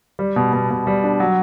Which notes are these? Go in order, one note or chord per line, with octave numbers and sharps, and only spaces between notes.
G3
B2
B2
B2
G3
D4
F#3